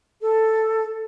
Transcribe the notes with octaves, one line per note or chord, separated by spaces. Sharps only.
A4